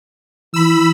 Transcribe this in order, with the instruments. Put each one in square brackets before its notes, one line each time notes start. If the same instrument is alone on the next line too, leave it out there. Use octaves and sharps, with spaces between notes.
[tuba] E3 [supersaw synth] B5 E6